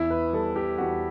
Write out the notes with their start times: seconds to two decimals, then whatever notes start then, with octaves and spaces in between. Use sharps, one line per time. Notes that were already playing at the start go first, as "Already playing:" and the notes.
Already playing: E2 E4
0.10 B4
0.33 G3 A4
0.56 G4
0.78 E2 F#4